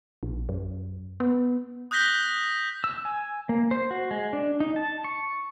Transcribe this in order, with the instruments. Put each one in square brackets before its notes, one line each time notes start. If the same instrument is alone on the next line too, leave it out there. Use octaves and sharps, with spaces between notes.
[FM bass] A#1
F#2
B3
[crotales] D#6 F#6 G6 A#6 B6 G7
[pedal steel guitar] E6
G#5
A#3
C5
F#4
G#3
D4
D#4
A5
C#6